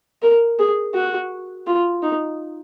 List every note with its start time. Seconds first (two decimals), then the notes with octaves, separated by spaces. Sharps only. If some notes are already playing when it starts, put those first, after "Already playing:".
0.22 A#4
0.59 G#4
0.95 F#4
1.67 F4
2.03 D#4